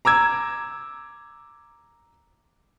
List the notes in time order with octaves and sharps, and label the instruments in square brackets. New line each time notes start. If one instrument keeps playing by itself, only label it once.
[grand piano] A#5 D6 E6 G#6